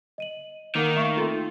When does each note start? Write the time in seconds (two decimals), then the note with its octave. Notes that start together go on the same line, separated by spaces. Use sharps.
0.18 D#5 D#7 F#7
0.76 D#3 A#3 A#4 F#5
0.97 A3 E5 F5 C#6
1.17 C4 D#4 F4 A4 C6